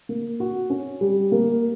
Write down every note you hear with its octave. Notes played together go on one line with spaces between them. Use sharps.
A#3
F#4
C#4
G3
A#3